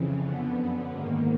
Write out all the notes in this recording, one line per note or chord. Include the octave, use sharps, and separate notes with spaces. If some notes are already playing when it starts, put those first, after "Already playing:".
Already playing: F2 C#3 E3
F2 D3 B3
F#2 D3
G#2 D#3 A#3